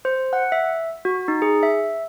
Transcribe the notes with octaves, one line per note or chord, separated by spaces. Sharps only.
C5
F#5
E5
F#4
D#4
G#4
E5